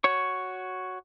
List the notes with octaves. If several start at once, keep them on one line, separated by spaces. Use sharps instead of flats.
F#4 C#5 C#6